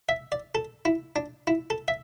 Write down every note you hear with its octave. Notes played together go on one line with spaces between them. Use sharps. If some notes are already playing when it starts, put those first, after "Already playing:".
E5
D5
A4
E4
D4
E4
A4
E5